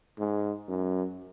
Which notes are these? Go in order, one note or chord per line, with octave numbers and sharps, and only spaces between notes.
G#2
F#2